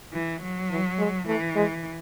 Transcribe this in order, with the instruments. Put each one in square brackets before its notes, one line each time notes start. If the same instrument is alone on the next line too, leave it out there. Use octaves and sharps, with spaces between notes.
[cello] E3
F#3
[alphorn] E3
G#3
[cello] E3 [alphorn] A3
[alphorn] G#3